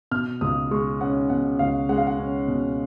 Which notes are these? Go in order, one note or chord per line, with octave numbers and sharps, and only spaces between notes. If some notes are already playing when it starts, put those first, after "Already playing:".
B2 F6
C#2 D#6
G#3 C#6
C#4 F#5
B2 F#5
C#2 F5
G#3 F#5
F5
F#5
C#4
B2